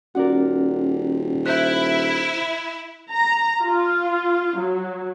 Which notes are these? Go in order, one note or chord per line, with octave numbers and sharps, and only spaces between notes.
D#1 C#4 F#4 A#4 D5 F#5
E4 C5 F#6 G6 B6
A#5
F4
F#3